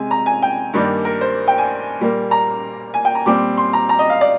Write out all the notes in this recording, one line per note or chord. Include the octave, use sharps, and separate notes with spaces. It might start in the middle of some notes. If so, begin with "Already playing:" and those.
Already playing: C3 G#3 G#5
A#5
G#5
G5
G2 D#3 G3 A#3 D4
A#4
C5
G5
G#5
A#2 G3 A#3
A#5
G#5
G5
A#5
A#2 G3 C4 D6
C6
A#5
A#5
D#5
F5
D5